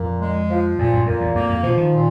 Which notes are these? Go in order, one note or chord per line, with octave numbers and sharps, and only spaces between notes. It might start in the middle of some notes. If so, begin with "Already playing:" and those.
Already playing: F2 A#2
G#3
F3
F2 A#2
F#2
F2 A#2
E2
F2 A#3
F2
B2 F3
D#3
A#2